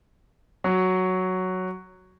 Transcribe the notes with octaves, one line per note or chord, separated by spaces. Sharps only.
F#3